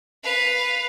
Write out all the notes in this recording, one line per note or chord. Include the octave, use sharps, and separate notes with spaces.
B4 F5